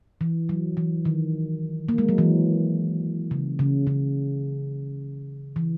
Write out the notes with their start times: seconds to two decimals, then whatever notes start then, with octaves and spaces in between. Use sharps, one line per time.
0.21 E3
0.49 F#3
0.77 E3
1.05 D#3
1.89 A#3
1.98 G#3
2.09 F#3
2.18 E3
3.31 C#3
3.59 C#3
3.87 C#3
5.56 E3